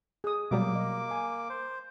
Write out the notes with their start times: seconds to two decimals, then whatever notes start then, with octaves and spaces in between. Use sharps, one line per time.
0.24 G#4 D#6
0.51 B2 F#3 G3 A#3 D6
0.75 D#5
1.11 G#5
1.50 C5